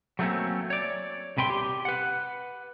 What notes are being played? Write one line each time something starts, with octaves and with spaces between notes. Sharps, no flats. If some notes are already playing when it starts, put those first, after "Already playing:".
F#3 G3 A3 A#3 C4 C#4
C#5 D5
C2 C3 B4 G5 C6
G4
B4 F#5